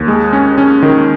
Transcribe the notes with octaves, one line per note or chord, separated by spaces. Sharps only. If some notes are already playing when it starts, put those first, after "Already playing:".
Already playing: D#2
G#3
C#4
C#4
D#3